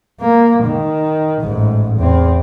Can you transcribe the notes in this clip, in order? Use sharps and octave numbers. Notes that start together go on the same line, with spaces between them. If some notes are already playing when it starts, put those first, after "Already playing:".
A#3
D#3
A1 G#2
E2 C4